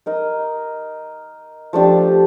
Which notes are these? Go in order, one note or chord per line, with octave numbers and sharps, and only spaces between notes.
D#4 A#4 D#5
F3 A3 D4 G4